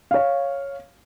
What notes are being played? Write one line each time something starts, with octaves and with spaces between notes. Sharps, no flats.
C#5 F5